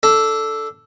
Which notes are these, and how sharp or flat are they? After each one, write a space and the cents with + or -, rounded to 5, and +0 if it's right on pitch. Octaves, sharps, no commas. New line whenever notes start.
D4 +0 A4 +0